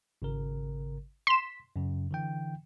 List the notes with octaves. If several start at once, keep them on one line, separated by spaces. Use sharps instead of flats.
G#1 C#3 A#4
C6 B6 E7
F#2 C#3
D3 E3 G5